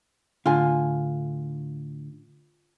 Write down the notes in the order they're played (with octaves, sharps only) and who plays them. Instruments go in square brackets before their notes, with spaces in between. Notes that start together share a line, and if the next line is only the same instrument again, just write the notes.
[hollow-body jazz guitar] A2 D3 [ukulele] F4 G#5